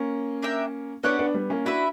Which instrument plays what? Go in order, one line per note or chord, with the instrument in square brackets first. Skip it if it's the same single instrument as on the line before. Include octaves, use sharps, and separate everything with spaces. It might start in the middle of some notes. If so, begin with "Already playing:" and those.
Already playing: [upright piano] A#3 C#4
[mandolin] D4 A#4 E5 G5
[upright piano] B3 D4 [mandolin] C#4 G4 C#5 F#5
[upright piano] B3 D4
G3 B3
A#3 C#4
[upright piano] D4 F#4 [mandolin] E4 B4 E5